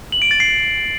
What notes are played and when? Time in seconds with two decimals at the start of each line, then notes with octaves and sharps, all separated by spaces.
0.12 F#7
0.22 D7
0.31 A6
0.40 C7